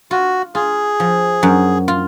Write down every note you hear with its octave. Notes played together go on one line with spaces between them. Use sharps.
F4 F#4
F4 G#4
F3
F#2
F4